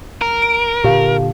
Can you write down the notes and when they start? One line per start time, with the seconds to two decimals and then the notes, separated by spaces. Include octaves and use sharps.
0.22 A#4
0.42 D7
0.84 A#2 D3 G4 F5